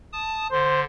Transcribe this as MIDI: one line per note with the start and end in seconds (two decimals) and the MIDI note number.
0.13 0.47 81
0.13 0.47 87
0.52 0.84 50
0.52 0.81 72